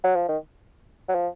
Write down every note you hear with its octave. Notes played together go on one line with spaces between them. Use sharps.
F#3
F3
D#3
F#3
F3